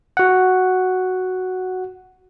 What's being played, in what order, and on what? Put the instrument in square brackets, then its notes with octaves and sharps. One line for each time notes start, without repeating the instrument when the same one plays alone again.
[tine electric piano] F#4 F#5